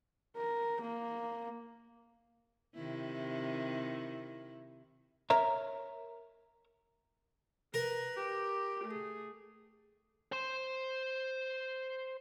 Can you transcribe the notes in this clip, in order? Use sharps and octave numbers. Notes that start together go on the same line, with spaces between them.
A#4
A#3
C3 D#3 E4
A#4 C#5 E5 A#5
A#4 B4
G4
A3 G#4
C5 C6